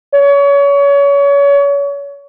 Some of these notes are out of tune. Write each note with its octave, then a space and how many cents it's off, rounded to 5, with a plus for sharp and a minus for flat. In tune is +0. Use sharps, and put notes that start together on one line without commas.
C#5 +30